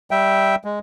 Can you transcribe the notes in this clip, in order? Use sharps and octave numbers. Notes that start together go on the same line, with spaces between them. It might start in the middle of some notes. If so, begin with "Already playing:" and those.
G3 E5 G5
G#3